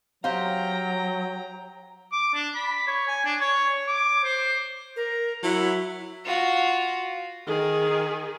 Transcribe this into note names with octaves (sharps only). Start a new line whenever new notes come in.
F#3 G4 C5 F5 G5 A#5
D6
D4
B5
C#5
G#5
D4
C#5
D6
C5
A#4
F#3 E4
F4 F#4
D#3 G#4